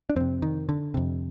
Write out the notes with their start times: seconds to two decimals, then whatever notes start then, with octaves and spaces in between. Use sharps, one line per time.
0.10 D4
0.16 F2 C3 C4
0.42 D#3
0.69 D3
0.94 F2 C3